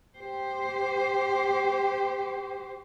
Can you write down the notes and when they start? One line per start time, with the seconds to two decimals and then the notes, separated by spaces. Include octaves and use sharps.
0.18 G4 C5